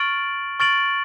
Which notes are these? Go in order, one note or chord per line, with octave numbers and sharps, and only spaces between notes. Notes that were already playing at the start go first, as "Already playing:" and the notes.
Already playing: C#6 F6 A6 D7 F#7
C#6 F6 A6 D7 F#7